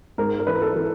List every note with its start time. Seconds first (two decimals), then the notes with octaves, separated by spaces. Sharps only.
0.18 G#2 A#4
0.39 A#4
0.47 E3 B4
0.53 A#4
0.62 A4
0.76 E3